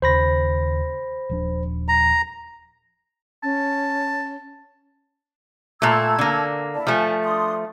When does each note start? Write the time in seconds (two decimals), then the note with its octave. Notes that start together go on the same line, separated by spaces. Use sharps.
0.02 D#2 C#3 C5 B5 A#6
1.29 D#1 F3 D4
1.88 A#5
3.43 C#4 A5
5.82 A#2 A3 A5 E6 G#6
6.19 D3 A#3
6.75 E4 D5 A5
6.87 F3 A3 G#5
7.23 D4 C6 D#6